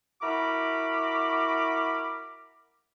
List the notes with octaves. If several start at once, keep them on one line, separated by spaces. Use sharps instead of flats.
E4 F#4 A#4 B5 D6